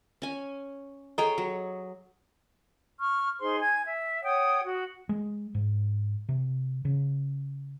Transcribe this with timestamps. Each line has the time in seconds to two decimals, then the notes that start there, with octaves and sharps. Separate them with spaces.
0.22 C#4 G#5
1.18 G#4 A4 C#5 D#5 G5 A#5
1.38 F#3
3.00 C#6 F6
3.40 D#4 G#4 C5 C6
3.61 G#5 G#6
3.86 E5
4.24 C#5 F#5 G5 D#6
4.63 F#4
5.09 G#3
5.55 G#2
6.29 C3
6.85 C#3